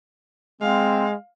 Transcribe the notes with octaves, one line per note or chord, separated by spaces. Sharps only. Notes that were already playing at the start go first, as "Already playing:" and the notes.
G#3 C4 F5